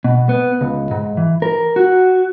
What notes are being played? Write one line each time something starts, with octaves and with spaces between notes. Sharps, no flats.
B2
B3
C#2
G#2
E3
A#4
F#4